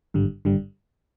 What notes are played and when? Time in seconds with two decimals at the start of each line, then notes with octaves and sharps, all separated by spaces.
0.14 G#1 G2 D3 G3
0.45 G#1 G2 D3 G3